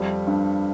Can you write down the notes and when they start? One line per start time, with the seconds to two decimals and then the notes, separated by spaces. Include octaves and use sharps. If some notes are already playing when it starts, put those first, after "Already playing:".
Already playing: F2 G3
0.27 G2